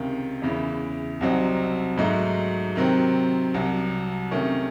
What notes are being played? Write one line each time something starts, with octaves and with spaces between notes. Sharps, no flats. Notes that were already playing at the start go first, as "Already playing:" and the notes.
Already playing: C#2 C3 D#3
E2 C#3 E3
C2 C3 F#3 C4 D#4
G#2 F#3 A3 D#4
C3 D#3 F#3 C4
C2 C3 F#3
C3 D#3 A3 C#4